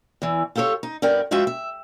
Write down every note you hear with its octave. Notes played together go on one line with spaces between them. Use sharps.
E2 E3
F4 G4 A4 A#4 C#5
D#4
G2 B3 A#4 D5 G5
F2 G#3 F4 F#4 E5 G5
E5